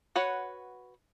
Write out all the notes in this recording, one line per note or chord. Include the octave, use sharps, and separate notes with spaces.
F#4 B4 C#5 F#5